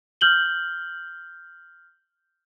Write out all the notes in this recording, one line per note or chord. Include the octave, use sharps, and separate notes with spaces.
F6 G6 F#7 G7